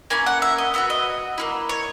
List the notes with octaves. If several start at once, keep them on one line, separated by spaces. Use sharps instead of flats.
A#3 C#4 E4 G#5
F#5
E5
D#5
B3 D#4 F#4 E5
D#5
A#3 C#4 E4
C#5